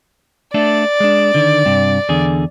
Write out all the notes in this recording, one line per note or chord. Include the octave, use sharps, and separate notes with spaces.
A3 D4 A4 D5
G#3 D4
D3 D#3
G2 C3
E2 D3 G#4